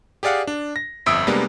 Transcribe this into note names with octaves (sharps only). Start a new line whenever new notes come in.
G4 G#4 D5 F5 F#5
D4
A#6
G1 F2 E5 D#6 E6 D7
C3 G3 G#3 A#3 B3 D4